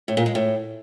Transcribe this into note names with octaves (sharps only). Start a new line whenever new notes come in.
A2
A#2
G#3
A2